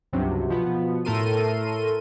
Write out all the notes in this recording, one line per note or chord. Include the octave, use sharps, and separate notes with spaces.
C#2 G2 C3 F#3
B2 F3 B3
A2 A3 A4 A#4 C6 D#7